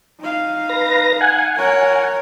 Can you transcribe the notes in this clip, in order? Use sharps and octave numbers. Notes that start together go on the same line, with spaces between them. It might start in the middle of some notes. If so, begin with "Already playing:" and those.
D#4 F5
B4 A#6
F#5 G#5
A#4 C#5